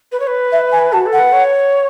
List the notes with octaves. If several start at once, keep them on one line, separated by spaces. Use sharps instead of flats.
B4
C#5
B4
E5
G#5
F#4 A5
A4
F#5
B4
C#5